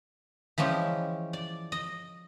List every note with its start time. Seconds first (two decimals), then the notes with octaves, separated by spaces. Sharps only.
0.58 E3 F3 G#3 C#4 G4
1.33 D5
1.72 D#5